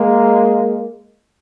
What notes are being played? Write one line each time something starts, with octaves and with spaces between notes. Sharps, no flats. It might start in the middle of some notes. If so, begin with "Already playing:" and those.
Already playing: G#3 A#3